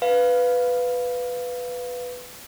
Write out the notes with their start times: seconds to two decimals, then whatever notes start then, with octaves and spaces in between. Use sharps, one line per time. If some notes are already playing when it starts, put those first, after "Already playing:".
0.02 B4 F5